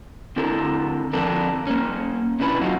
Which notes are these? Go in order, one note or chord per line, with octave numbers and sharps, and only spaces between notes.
D3 C4 E4 A4 A#4
D3 F3 C4 D4 A4 A#4
A#3 C#4
C3 C#4 D4 E4 B4
F#2 D#4 F4 F#4